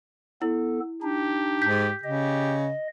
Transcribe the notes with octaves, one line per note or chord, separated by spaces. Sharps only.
B3 E4 A4
D4 D#4 G4
G#2 G6 B6
C#3 G4 D#5